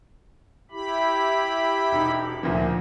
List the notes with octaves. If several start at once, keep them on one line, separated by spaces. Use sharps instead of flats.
E4 G4 B5
E1 D#4
D2 A#2 F3